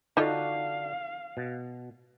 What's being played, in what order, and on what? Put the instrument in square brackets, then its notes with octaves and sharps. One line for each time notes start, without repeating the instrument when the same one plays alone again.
[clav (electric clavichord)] D3 D4 F#4 [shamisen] D#4 F4 A4 [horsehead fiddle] F5
[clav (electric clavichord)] B2